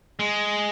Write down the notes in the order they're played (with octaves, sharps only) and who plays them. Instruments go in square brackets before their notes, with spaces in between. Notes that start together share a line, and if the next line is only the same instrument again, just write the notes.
[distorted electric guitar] G#3